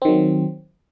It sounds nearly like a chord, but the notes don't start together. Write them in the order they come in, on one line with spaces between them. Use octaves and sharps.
C4 D#3 F#3